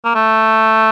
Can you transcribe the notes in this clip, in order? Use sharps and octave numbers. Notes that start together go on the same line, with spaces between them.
A#3
A3